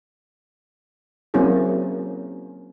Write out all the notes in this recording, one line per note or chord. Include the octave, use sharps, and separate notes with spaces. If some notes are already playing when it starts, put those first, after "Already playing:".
F#3 A#3 C4 C#4 E4 G#4